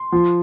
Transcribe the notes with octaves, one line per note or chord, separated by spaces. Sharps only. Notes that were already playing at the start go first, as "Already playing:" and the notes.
Already playing: C6
F3